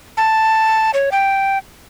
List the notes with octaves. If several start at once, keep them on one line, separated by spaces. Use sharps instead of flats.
A5
C#5
G5